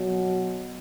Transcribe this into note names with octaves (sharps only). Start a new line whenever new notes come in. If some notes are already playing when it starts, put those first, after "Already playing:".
Already playing: B2 F#3